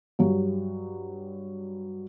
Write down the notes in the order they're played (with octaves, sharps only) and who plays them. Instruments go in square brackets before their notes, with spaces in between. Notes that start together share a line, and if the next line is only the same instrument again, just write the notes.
[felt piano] G2 F#3 G3